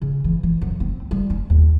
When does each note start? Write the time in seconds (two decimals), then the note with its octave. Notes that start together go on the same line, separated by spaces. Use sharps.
0.02 C#3
0.24 E3
0.43 E3
0.62 F#2
0.80 C4
1.11 G3
1.30 C#4
1.50 D#2